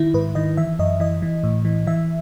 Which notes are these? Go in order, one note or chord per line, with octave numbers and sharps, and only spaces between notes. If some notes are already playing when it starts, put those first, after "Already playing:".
Already playing: D#3 E4
G#2 B4
D#3 D#5
E3 E5
F#2 D#5
E3 D#5
E3
A2
E3
E3 E5